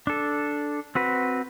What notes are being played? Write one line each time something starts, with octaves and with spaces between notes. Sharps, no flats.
D4 A4
C4 F#4 B4